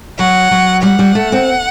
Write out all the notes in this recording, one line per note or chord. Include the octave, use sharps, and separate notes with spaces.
F#3 F#5
F#3
G3 F#5
G3
A3
C4